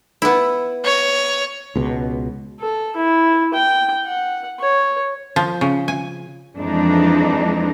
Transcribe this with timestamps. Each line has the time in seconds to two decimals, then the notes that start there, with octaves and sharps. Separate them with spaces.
0.22 B3 E4
0.84 C#5
1.76 C#2 B2
2.60 A4
2.96 E4
3.54 G5
4.06 F#5
4.60 C#5
5.36 F3
5.61 C#3
5.88 G#5
6.57 F2 E3 G#3 D4 D#4